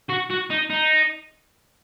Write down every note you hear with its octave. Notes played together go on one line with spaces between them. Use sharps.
F#4
F#4
D#4
D#4